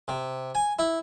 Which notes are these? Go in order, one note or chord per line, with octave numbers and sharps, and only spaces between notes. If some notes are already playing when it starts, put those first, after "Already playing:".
C3
G#5
E4